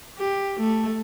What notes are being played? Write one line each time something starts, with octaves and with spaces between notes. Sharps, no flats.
G4
A3